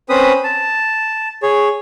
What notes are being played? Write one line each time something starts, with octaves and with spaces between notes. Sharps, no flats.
C4 C#4 B4 C5 B5 D#6
A5
G#4 C#5